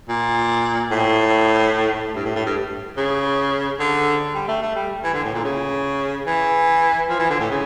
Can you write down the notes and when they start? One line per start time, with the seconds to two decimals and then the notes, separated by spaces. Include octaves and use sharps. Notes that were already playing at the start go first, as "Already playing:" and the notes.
0.09 A#2
0.91 A2
2.15 G2
2.25 A2
2.35 A2
2.46 G2
2.97 C#3
3.80 D3
4.35 G3
4.48 A3
4.62 A3
4.76 G3
5.03 E3
5.14 D3
5.24 A2
5.34 A#2
5.44 C#3
6.27 E3
7.09 F3
7.19 E3
7.30 D3
7.40 A2
7.50 C#3